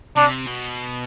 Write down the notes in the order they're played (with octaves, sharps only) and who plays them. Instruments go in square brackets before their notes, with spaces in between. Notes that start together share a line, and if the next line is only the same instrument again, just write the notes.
[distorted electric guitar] C3 [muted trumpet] D4
[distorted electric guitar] B2